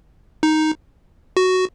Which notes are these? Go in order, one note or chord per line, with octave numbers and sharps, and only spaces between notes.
D#4
F#4